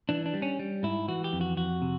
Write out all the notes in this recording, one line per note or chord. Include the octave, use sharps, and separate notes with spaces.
E3 D4
D4
G3
C#4
G3
G#2 E4
E3 F#4
G4
F2
F#4
F2 F#4
C3